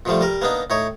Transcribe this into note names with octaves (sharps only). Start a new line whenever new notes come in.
A#2 D3 F3 G3 A3
G3 A#4
A#3 B3 D4 D#4
A2 D#4 C#5